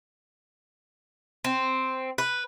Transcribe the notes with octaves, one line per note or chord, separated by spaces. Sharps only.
C4
B4